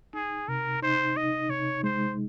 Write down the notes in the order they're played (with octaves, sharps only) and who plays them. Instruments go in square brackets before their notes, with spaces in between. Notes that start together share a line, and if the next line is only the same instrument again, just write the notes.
[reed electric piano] D#4 [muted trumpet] G#4
[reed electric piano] C3 [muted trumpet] A#4
[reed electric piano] D#4 [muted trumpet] C5
[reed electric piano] D#4 [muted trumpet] D#5
[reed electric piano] C3 [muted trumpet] C#5
[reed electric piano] G#3 [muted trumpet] C5